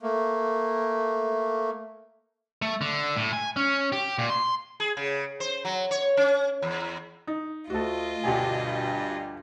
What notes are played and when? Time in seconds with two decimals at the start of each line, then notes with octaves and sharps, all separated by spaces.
0.02 A3 A#3
2.62 A3
2.81 D3
3.16 A2
3.33 G#5
3.56 C#4
3.92 G4
4.18 A#2
4.30 C6
4.80 G#4
4.97 C#3
5.40 C5
5.65 F#3
5.91 C#5
6.17 C#4
6.62 E2
7.27 D#4
7.70 D2 F4 F#4 A4 D#5
8.24 D2 G2 B2 G4 G#5